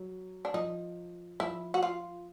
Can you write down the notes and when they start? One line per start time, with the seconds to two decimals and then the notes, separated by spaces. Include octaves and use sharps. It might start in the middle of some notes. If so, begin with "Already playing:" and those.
Already playing: F#3
0.45 D4
0.54 F3 D#4
1.40 F3 E4
1.74 F#4
1.83 F4